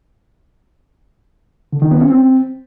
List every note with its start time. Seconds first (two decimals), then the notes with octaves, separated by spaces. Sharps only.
1.73 D3
1.82 D#3
1.91 B3
2.00 C#4
2.10 C4